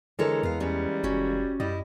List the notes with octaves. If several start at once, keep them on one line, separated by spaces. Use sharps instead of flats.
D3 E3 G#3 A4 A#4 C#5 A#5
E2 B3 F5
G3 B3 C#4
F#1 C#4 F#4
F#2 G3 E4 D#5